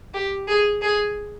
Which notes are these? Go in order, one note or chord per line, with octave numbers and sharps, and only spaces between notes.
G4
G#4
G#4